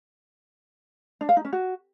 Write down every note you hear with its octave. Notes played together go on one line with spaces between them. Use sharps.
D4
F5
D#4
C#4
F#4